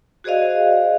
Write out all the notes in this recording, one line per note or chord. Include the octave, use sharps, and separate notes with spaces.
F#4 G#4 C5 D5 D#5 F5